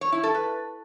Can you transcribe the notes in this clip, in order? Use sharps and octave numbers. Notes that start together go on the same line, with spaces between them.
C#5
E4
A4
B4